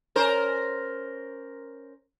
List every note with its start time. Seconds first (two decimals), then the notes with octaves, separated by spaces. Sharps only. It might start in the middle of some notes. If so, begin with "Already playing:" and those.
0.16 C#4 A#4 C5